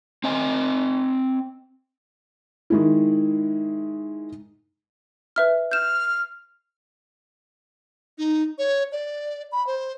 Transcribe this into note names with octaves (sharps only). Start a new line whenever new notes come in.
C4 D#5 G#5
D#3 G#3 E4
B4 E5 F6
F6 G6 E7
D#4
C#5
D5
B5
C5